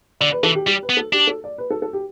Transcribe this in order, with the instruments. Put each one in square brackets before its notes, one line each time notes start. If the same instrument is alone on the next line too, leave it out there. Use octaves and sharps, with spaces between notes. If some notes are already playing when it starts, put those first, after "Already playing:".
[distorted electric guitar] D3 [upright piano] D5
[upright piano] B4
[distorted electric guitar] E3 [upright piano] A4
[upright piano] G4
[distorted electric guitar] G3 [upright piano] G4
[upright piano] B4
[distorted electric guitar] B3
[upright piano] A4
[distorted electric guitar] D4 [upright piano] G4
[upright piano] A4
D5
B4
A4
A4
G4